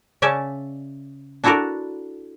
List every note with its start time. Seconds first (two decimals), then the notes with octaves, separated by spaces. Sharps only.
0.22 C#3 C#4 D5 E5 A5
1.44 D4 E4 F#4 A4 A#4 D5